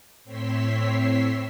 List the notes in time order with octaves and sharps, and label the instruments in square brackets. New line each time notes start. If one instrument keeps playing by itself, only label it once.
[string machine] A2 C4 C#5 C6 E6 B6